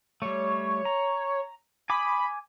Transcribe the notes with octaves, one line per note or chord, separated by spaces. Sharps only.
G3 A3 C#5
A#5
G#5 B5 D6 D#6